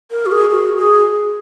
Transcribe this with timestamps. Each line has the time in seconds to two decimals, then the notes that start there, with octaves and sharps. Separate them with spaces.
0.11 A#4
0.26 F#4
0.32 G#4
0.51 F#4
0.78 G#4